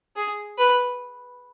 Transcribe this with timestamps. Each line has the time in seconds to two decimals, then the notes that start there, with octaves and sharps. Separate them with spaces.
0.16 G#4
0.58 B4